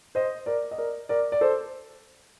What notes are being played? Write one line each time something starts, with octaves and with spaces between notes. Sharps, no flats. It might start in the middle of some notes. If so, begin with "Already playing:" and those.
C5 D#5
A#4 D5
D#5
A#4 D5
A#4 D5
D5
A4 C5